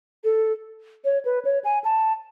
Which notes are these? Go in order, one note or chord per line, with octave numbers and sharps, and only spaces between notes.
A4
C#5
B4
C#5
G#5
A5